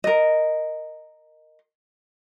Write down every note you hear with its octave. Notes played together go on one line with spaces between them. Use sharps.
A#4 D#5